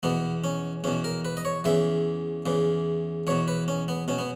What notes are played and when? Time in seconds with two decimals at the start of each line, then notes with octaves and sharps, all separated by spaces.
0.03 E2 B2 B3
0.44 C#4
0.84 E2 B2 C#4
1.04 A#4
1.25 B4
1.37 D#5
1.45 C#5
1.64 E2 C#3 E3 E5
2.46 E2 C#3 E3
3.27 E2 B2 C#5
3.48 B4
3.68 C#4
3.88 B3
4.08 B2 C#4
4.18 B3